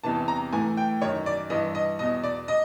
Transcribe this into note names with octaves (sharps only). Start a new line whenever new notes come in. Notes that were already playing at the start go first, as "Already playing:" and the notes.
E2 C3 E3 A5
A#5
A2 E3 G#5
G5
F#2 D#3 C#5
D5
G2 E3 D#5
D#5
E2 B2 D#5
D5
D#5